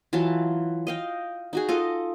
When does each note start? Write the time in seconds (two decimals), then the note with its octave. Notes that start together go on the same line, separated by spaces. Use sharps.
0.13 E3 F#3 F4 A5
0.87 D#5 F5 G5
1.53 D#4 F#4 G#4
1.69 F4 A4 D#5